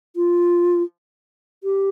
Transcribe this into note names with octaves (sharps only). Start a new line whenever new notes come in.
F4
G4